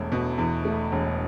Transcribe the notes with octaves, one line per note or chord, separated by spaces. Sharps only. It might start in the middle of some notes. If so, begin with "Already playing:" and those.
Already playing: E1 E2 A3
B2
E2
A3
E1